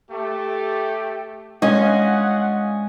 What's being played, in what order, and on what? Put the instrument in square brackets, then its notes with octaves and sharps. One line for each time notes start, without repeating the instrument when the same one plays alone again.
[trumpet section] A3 G4
[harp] G#3 [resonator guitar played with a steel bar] C#4 [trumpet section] F4 F#5 [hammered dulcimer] D#5 G#5